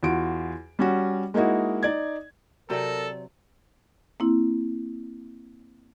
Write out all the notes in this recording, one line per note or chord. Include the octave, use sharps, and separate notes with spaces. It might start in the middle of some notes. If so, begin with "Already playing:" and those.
E2 F4 F#4 D7
G3 C#4 F#4
G#3 A#3 D#4 E4 F#4
D#4 D5 G#6
C3 F#3 C4 A4 A#4 D5
A#3 C4 E4